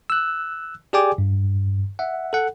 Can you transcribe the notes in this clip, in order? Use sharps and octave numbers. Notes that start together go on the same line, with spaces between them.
E6 F#6
G4 G#4 D5 G5 G#5 D6
G2
E5 F#5
A4 F#5